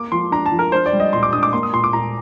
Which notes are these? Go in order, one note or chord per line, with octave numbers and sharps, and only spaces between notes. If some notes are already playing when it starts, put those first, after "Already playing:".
Already playing: A#3 D6
F3 C6
D4 A#5
A5
F3
A#4
D4 C5
D5
G3
D#5
A#2 C6
D6
D4 D#6
D6
A#3 C6
D#6
A#2 C6
D6
A#2 A#5